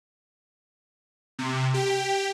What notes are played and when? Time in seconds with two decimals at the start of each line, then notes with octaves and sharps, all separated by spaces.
1.39 C3
1.74 G4